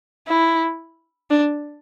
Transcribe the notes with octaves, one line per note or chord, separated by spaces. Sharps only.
E4
D4